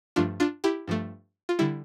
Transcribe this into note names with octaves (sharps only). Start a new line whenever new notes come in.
G2 F3 A3 D4 F4
D4 F4
E4 G4
G2 F3 A3
F4
D3 G3 E4